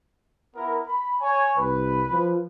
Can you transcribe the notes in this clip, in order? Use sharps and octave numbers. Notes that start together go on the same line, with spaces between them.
B3 E4 A#4
B5
C#5 G#5
C2 B4
F3